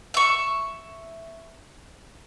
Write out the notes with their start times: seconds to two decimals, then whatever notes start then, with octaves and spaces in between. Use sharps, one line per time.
0.14 E5 C#6